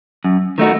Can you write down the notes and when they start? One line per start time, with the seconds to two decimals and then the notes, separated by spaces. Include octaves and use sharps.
0.25 F#2
0.58 D#3 A3 D#4 F#4